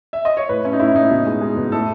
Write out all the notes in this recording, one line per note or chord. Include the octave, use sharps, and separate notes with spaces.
E5
D#5
C#5
A2 B4
A3 C#4
D#4
A2 E4
A2 D#4
B2
G#3
G#3
B2
A2 A4